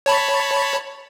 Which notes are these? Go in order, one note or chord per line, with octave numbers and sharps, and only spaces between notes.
C#5 A5 B5